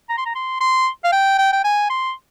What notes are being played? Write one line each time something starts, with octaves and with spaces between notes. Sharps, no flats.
A#5
C6
A#5
C6
C6
F5
G5
G5
G5
G#5
C6